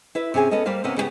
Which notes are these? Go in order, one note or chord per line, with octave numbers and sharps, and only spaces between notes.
E4 B4 E5
C3 C#4 G#4 G#5
B3 C#4 A4 D#5
G3 A#3 B4 C5 F5
C3 A#3 B3 C#4
C#3 G3 B3 G4